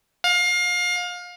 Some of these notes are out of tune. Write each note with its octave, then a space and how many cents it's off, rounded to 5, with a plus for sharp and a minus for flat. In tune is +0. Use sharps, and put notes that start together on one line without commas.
F5 +30